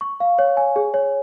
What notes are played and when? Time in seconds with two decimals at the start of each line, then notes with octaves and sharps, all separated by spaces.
0.01 C#6
0.20 F5
0.39 C#5
0.57 G#5
0.76 G#4
0.94 C#5